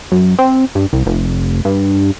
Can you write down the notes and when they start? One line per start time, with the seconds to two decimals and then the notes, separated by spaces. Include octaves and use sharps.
0.12 F#2
0.39 C4
0.75 G2
0.93 C2
1.06 F1
1.65 G2